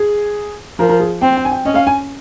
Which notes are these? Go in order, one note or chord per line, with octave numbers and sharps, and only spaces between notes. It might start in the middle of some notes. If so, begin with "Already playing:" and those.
Already playing: G#4
F3 A#4
A#4
G#4
C4 G5
G5
G#5
G5
C#4 D#5
F5
G#5